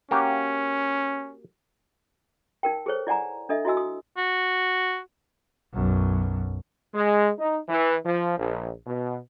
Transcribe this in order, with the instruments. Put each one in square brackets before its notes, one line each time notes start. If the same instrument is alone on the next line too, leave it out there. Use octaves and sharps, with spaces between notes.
[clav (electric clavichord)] A#3 F#4 G4 [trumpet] C#4
[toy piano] D#4 A#4 G5
G#4 A4 C5 C#5
E4 D5 F#5 G#5 A#5
D4 A4 D#5 E5
E4 F#4 D#5 G#5 E6
D#6
[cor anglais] F#4
[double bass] B1 F#2
[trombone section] G#3
D#4
E3
F3
A#1
B2